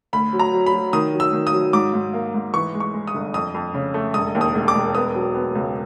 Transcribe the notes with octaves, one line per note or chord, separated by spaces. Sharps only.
D2 B5
F#3
A#5
F#3
B5
F#3
D#3 D#6
F#3
E6
D#3
D#6
F#3
G#2 D6
G#2
A#3
G#2
E3 C#6
G#3
C#6
G#3
D#6
G1
F2 D#6
F2
C#3
A3
E1 D#6
D#2
D#6
E1
D6
E1
B3 D#6
F#3
B3
C#2